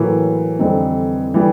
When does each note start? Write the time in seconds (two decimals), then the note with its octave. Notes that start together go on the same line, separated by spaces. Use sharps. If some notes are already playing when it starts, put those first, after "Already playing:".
Already playing: A2 E3 F#3 A#3
0.59 F2 D3 G3 C4 D#4
1.34 D3 E3 G3